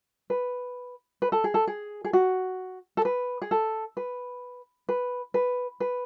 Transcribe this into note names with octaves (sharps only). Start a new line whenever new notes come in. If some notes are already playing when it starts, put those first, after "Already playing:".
B4
B4
A4
G#4
A4
G#4
G#4
F#4
A4
B4
G#4
A4
B4
B4
B4
B4